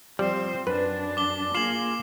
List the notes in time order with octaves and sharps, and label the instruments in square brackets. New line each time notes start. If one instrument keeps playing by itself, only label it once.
[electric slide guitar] F3 [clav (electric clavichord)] G3 [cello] C4 C5
[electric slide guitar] F#2 [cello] D4 [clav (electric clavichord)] B4
[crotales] D6 G7
[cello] A#3 [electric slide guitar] F4 G#4 [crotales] C7 E7 F#7